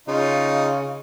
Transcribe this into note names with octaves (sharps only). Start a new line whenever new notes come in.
C#3 D#4 F4